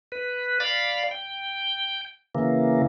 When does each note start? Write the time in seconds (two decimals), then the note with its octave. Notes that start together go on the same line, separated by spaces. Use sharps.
0.12 B4
0.60 D5 F5 B5
1.11 G5
2.35 C#3 E3 A#3